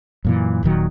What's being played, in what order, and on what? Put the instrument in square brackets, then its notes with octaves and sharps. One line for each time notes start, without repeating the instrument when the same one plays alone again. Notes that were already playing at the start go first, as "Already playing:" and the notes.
[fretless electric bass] F#2 A#2 E3
D#1 A#2 D#3 F#3